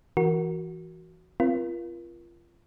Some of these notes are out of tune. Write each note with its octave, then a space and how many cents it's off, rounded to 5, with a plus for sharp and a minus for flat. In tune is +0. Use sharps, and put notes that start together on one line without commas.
E3 +0 F#4 +0 A#4 +0
C4 -5 F4 -30 A#4 +40